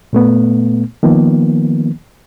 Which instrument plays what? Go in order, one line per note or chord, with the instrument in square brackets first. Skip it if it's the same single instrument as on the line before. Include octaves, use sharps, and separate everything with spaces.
[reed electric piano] A#2 A3 B3
D#3 F3 A#3 B3